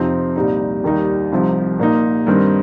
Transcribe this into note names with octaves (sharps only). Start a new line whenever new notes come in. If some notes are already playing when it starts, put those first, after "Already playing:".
Already playing: F2 C3 F3 C4 D#4
C2 A#2 G3 D#4
D#2 D#3 G3 D#4
C2 C3 F3 D#4
A#2 A#3 D#4
G2 D#3 C4 D#4